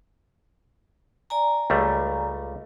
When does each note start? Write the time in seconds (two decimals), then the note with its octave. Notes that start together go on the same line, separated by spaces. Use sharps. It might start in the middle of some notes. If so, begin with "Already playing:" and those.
1.30 D5 G#5 A#5
1.70 C#2 G3 A3